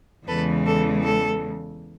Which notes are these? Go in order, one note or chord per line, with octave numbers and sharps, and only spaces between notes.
E2 C#3 E3 G#3 A4 B4
A4
A4